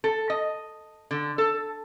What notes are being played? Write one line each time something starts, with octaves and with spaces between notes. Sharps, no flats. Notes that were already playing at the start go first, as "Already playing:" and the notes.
A4
D#5
D3
A4